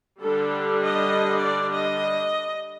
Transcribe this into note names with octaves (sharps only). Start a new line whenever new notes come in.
D3 G3 D4 A4
D#5
D5
D#5